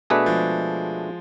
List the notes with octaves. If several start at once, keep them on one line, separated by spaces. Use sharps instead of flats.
B2 A3 D4 G#4 B4
F3 G#3